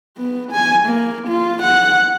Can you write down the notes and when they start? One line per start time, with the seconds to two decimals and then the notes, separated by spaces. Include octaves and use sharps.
0.17 B3
0.51 G#5
0.85 A#3
1.28 F4
1.62 F#5